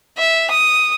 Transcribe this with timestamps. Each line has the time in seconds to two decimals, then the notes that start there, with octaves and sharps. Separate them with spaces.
0.18 E5
0.50 D#6